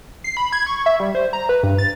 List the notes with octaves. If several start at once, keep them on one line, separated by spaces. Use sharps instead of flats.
C7
B5
G#6
C#6
E5
G3
C5
A#5
B4
G2
A6